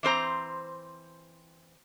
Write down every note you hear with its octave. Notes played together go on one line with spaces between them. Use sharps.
E3 C4 C5 A#5